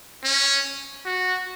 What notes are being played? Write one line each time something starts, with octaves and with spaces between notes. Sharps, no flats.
C#4
F#4